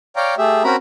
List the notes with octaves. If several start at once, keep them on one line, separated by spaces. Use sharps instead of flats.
C#5 D5 F5 G5 A#5
A3 G4 G#4 E5
C4 C#4 F#4 A#4 A#5 B5